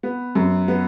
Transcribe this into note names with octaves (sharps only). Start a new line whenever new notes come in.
B3
F#2
B3